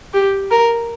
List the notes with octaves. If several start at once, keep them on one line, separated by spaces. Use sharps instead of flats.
G4
A#4